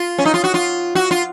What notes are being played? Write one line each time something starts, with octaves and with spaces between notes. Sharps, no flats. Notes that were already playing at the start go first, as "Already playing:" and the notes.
Already playing: F4
C#4
D#4
F4
F#4
F4
F#4
F4